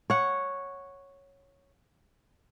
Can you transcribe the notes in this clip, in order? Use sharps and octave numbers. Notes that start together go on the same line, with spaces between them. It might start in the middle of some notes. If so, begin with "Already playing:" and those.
C#5 F#5